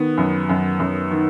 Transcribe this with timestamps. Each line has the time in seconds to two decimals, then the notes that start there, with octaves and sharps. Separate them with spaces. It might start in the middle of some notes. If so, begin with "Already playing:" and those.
Already playing: D#3 B3
0.18 F#2
0.49 F#2
0.80 F#2
1.11 D#3